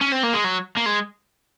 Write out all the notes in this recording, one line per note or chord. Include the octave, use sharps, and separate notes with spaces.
C#4
C4
A#3
G#3
F#3
A#3
G#3